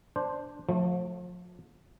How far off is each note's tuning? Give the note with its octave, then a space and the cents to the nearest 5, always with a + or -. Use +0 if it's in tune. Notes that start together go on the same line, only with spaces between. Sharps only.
D4 +0 C5 +0
F3 +40 A3 +0